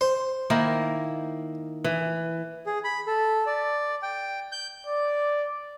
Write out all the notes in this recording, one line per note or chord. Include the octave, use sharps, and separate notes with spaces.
C5
D#3 A#3 E4
E3
G#4
B5
A4
D5
G5
G6
D5